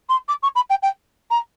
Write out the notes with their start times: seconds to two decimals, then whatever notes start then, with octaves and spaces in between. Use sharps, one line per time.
0.09 C6
0.28 D6
0.42 C#6
0.55 B5
0.70 G5
0.82 G5
1.30 A#5